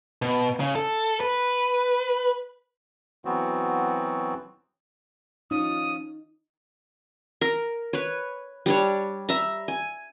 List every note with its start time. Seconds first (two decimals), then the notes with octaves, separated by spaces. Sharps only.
0.22 B2
0.60 C#3
0.75 A4
1.20 B4
3.25 E3 F#3 B3 C4 F#4
5.51 F3 C#4 D#4 F4 D#6
7.41 A#4
7.93 B4 C#5
8.66 G3 D4 C#5
9.29 E5 A#5
9.68 G#5